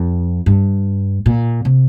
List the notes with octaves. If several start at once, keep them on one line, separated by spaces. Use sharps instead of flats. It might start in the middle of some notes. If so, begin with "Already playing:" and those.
Already playing: F2
G2
A#2
C3